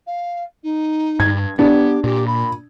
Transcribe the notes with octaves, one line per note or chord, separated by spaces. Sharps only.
F5
D#4
G2 G#6
B3 D4 G4
A#2 G4
B5